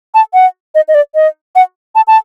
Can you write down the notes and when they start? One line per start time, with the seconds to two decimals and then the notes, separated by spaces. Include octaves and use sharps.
0.14 A5
0.34 F#5
0.75 D#5
0.88 D#5
0.95 D5
1.15 D#5
1.56 F#5
1.95 A5
2.08 A5